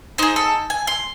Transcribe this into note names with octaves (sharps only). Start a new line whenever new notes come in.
D#4 G#4 C5
A4
G#5
C6